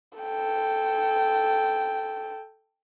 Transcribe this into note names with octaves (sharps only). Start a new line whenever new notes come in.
A4 G5